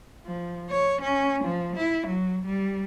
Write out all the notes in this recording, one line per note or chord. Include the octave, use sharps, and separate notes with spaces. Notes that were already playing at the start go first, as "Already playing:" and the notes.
F3
C#5
C#4
F3
E4
F#3
G3